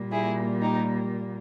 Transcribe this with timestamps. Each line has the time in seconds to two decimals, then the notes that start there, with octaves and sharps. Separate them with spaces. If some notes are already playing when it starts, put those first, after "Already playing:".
Already playing: A#2 G3 A#3
0.11 E4 G#4
0.61 D#4 G4